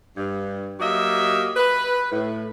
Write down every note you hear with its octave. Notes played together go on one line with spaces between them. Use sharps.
G2
F#3 A#3 G4 D#5 E5
B4
A2